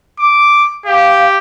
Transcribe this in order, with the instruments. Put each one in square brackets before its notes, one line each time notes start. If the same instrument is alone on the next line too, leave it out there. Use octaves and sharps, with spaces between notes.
[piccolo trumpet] D6
[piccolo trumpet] G4 [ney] F5